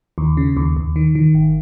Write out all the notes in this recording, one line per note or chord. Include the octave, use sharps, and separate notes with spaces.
D#2
C#3
D#2
D#2
D#3
D#3
G#1